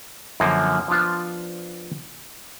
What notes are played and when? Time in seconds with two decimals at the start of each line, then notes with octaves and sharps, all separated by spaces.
0.40 F#2 D3 F3 A#3
0.88 F3 B3 D4 F4